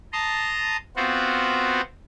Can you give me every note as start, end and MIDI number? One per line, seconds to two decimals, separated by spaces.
0.13 0.77 81
0.13 0.77 82
0.13 0.77 84
0.13 0.77 87
0.96 1.81 59
0.96 1.81 60
0.96 1.81 65
0.96 1.81 66
0.96 1.81 72